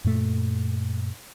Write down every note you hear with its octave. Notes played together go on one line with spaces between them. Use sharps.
F#2 A#2 A3